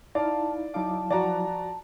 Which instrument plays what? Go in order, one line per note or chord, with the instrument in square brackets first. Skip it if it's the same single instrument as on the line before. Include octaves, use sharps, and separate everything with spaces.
[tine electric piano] D#4 E4 [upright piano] D5 [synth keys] F5 [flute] A5
[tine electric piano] F#3 E4 F5 [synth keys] D#4 D6 [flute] A5
[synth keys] F3 F#4 [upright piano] D5 A#5